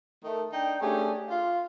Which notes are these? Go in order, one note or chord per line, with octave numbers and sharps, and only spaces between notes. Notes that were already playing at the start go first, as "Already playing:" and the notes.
D#3 A3
D4 D#4 G5
A3 C#4 D4 G4 G#4
F4 F5